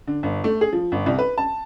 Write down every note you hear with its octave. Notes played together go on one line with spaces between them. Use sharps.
D3
G1
A3
G#4
F3
G1
C2
B4
A5